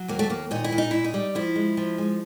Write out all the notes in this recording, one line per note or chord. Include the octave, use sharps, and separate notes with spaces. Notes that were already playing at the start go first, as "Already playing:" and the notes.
Already playing: F#3
D#2 A#3
A3
D#2 A#3
A#2 D#4
E4
A#2
D#4
A#2 E4
D#4
G3
F3 E4
G#3
F3
G#3